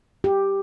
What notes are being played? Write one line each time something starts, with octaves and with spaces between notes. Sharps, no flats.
G4